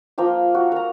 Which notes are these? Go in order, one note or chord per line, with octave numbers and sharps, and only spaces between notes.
F3 A#3 A#4 G5
F#4
A#4 A#5